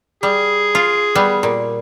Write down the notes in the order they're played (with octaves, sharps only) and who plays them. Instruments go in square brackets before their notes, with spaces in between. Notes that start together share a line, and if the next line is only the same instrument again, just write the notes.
[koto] G3 [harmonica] G#4
[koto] F4
G3 B3
A#2